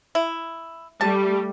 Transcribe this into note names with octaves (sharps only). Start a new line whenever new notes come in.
E4
G3 A3 A5